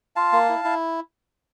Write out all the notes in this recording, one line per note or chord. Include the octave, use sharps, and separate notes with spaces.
F4 F5 A5
A#3
E4
E4